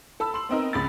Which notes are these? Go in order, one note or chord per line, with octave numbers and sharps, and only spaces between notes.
A4 A5 B5 E6
C6 F#7
B3 C4 D#4 A#4
C#2 B5 A6